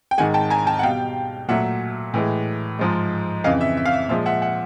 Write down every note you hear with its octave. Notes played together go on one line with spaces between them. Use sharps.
G5
G#2 D#3 G#3 F#5 G#5
G5 A5
G#5 A#5
G5 A5
F#5
B2 G3 F5 G5
A#2 F#3 A3 E5 F#5
A2 E3 G#3
G#2 F3 G#3
F2 C#3 E3 D#5 F5
E5
E5
F5
E5
A#2 F3 G#3 E5
E5 F#5
E5 F#5